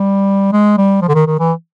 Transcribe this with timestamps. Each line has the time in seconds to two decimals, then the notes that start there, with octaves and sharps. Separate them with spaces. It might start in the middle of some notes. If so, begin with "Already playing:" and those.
Already playing: G3
0.52 G#3
0.77 G3
1.02 F3
1.08 D3
1.15 D#3
1.27 D#3
1.39 E3